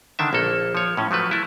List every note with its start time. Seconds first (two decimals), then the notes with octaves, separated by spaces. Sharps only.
0.19 D3 D#3 D4 E5
0.33 A#1 A#3 A4
0.75 F3 C#5
0.97 A2 C#4
1.11 F3 F#3 A3 B4
1.31 A3 E4